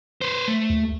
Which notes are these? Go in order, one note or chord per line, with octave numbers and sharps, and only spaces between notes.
B4 C5
A3
D#2